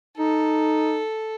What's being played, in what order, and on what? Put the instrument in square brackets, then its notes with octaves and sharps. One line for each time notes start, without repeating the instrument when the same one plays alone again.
[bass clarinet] D#4 [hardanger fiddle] A4